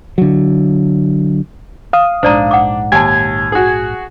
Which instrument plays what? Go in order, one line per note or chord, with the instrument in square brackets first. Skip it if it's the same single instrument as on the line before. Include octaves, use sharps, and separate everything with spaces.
[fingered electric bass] D3 F#3
[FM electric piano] F5 D#6
[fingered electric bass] A#1 G#2 [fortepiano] D4 [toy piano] C5 D5 A#5
[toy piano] F#5 D6
[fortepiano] D#2 [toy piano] G#5 A5 [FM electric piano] G#6
[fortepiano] F#4 G#4